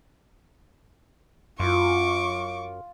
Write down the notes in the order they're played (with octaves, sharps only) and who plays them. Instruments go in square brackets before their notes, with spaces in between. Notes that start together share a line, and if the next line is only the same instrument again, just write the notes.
[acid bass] F#2 [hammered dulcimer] F4 [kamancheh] C#6 D6